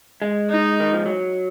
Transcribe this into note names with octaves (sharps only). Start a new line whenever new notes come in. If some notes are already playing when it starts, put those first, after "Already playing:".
G#3
D#4
D#3
F3
F#3